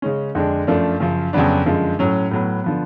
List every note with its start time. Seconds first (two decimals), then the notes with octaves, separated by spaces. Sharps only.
0.02 C#3 G#3 C#4
0.35 F2 D3 G#3 D4
0.67 F#2 F3 A3 D4
1.00 F#2 C#3 F3
1.33 F2 C#3 F#3 B3 D4
1.66 F#2 D3 F3 G#3
1.99 A2 F#3 C#4
2.31 A2 F#3 B3
2.64 D3 F3 B3